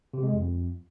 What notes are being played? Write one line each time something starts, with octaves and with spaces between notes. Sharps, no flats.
C3
G#3
F2